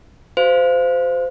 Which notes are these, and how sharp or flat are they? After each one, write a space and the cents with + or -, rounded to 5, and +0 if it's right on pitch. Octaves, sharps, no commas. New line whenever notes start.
F#4 +15 C5 -25 F5 -10